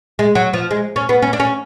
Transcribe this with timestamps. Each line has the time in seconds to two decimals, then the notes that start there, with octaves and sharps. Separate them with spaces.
0.19 G#3
0.35 F#3
0.54 F3
0.71 G#3
0.96 C#4
1.09 B3
1.22 C#4
1.33 D4
1.40 C#4